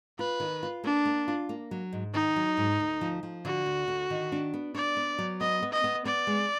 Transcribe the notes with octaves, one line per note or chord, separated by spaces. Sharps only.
F4 B4
D#3
F4
A#3 D4
A#3
F4
A#3
F#3
G#2
D#3 D#4
F#3
G#2
D2
F3
F3
D3 F#4
D2
D3
D#3
D4
B3
D4 D5
B3
F#3
B3 D#5
B3
D#5
B3
B3 D5
G#3